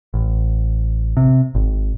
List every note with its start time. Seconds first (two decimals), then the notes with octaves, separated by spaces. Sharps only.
0.14 A1
1.17 C3
1.55 G#1